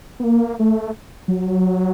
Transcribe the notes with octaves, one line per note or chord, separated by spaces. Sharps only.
B3
A#3
A3
F#3